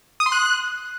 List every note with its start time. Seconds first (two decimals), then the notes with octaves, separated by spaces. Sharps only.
0.20 D#6
0.26 C6
0.32 F#6